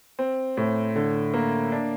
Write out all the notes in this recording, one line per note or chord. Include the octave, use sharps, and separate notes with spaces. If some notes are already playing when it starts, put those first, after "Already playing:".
C4
A2
D3
A#3
D4